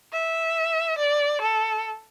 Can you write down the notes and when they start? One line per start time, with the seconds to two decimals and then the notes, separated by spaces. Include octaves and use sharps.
0.13 E5
0.98 D5
1.41 A4